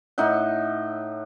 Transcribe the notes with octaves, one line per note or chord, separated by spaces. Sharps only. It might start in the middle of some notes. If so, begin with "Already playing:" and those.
A2 D#4 E5 F#5